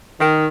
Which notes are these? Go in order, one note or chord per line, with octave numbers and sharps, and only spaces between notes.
D#3